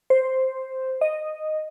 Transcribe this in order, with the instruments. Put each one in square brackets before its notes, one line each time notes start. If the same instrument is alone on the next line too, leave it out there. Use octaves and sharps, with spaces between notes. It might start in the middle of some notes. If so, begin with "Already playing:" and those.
[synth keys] C5
D#5